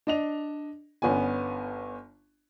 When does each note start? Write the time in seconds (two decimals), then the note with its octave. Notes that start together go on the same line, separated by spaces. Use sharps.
0.07 D4 D#5 F7
1.02 G1 B3 C#4 G#5